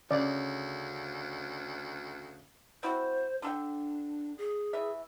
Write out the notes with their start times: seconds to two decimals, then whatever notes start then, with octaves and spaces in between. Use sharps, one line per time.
0.11 D2 C#3 D5
2.83 C4 E4 F#4 C5
3.42 D3 D4 A4 G5
4.38 G#4
4.73 E3 E5